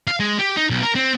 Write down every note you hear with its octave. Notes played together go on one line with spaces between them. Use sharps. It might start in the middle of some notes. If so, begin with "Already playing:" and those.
F5
G#3
G4
D#4
B1
A#4
C4